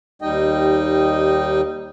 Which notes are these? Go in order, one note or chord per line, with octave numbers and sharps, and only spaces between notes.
D#2 G3 D#4 D#5 G5